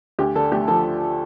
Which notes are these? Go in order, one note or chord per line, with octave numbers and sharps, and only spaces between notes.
D2 G4
D3 A4
A3 G4
F3 A4